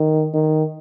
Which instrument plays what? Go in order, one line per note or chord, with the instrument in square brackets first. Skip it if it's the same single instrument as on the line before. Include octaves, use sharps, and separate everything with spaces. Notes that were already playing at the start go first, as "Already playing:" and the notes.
Already playing: [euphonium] D#3
D#3